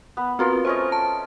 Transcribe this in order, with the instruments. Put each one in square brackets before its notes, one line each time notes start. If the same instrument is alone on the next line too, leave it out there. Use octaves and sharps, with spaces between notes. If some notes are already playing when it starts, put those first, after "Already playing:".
[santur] B3 B4
[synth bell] C4 F#4 B4 [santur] F4 A#4
[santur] A3 C#4 D#5 [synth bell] C5
[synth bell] A5